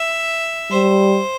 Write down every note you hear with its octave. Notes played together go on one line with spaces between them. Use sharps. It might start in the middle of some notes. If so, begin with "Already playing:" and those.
Already playing: E5
G3 C5